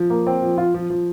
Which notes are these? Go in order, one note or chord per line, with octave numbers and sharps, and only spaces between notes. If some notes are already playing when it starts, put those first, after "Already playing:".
Already playing: F3
A#3
C4
F3
F4
F3
F3